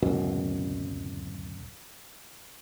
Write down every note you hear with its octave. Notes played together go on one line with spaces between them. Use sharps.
D1 C#2 F#2 B2